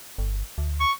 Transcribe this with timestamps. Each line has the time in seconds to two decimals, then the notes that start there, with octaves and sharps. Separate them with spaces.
0.18 G1
0.58 D2
0.80 C#6